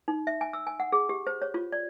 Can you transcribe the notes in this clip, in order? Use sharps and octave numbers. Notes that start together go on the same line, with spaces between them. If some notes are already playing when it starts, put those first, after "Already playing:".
D#4
E5
G#5
E6
G#5
F#5
G#4
G4
C5
C#5
F4
D5